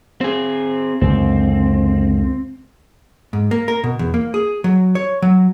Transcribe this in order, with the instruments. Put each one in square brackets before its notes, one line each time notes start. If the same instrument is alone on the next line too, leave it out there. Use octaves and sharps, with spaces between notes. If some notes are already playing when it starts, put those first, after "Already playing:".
[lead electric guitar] C4 G#4
[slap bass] C#2 F#2 D3 [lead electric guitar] C4
[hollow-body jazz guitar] G#2
A#3
A#4
B2
E2
A#3
G#4
F#3
C#5
F#3